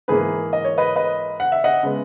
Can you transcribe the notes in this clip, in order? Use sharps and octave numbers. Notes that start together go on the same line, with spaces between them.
G#2 E3 A#3 G#4 B4
D#5
C#5
B4 D#5
B4 D#5
F#5
E5
D#5 F#5
C#3 G#3 B3